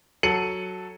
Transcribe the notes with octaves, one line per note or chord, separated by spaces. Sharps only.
F#3 A4 C#7 D#7 F#7